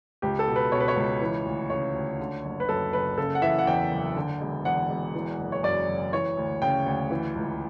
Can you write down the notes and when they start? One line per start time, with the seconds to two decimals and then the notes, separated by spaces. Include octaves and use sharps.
0.22 C#2 G4
0.39 A4
0.48 B2
0.56 B4
0.72 B2 C#5
0.80 B4
0.88 C#5
0.96 C#2
1.21 E3
1.46 D2
1.70 C#3 C#5
1.95 D2
2.20 D3
2.44 F#1
2.60 B4
2.69 F#2 A4
2.93 F#1 B4
3.17 C#3 A4
3.35 F#5
3.42 E3 E5
3.59 F#5
3.67 E2 G5
3.91 F#1
4.16 D3
4.41 E1
4.65 E2 F#5
4.89 E1
5.15 E3
5.39 F#1
5.52 C#5
5.63 F#2 D5
5.88 F#1
6.13 E3 C#5
6.37 D2
6.62 C#3 G5
6.86 D2
7.11 E3
7.35 C#2